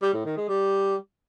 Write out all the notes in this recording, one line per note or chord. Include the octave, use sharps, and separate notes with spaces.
G3
A2
D#3
G#3
G3